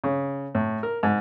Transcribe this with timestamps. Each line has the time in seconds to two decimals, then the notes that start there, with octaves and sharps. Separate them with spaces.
0.04 C#3
0.55 A2
0.83 A#4
1.03 G#2